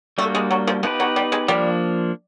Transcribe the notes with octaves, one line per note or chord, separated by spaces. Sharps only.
G3 A3 A#3 D4 F#4
G#3
F#3
F3
F3 B3 D#4 G4 B4
F#3
G3
G#3
F3 G3 A#3 D4